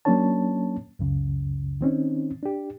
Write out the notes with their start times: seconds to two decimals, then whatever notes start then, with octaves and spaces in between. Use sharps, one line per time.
0.05 F#3 A#3 C#4 D4 C#5 A5
0.99 C#2 F#2 C#3
1.81 D#3 C4 C#4 D#4
2.43 D4 G4